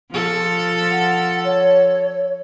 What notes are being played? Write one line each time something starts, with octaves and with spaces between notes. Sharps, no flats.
F3 A4
F#5
C#5